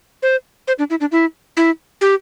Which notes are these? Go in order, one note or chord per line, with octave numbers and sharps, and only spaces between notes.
C5
C5
D4
E4
D4
E4
E4
G4